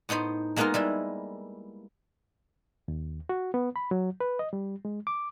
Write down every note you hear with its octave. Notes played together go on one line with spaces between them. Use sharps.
A2 B3 D#4 C5 B5
G#3 A#3 B3 D#4 F4 A#4
G3 G#3 E4
D#2
F#4
B3
B5
F#3
B4
D#5
G3
G#3
D6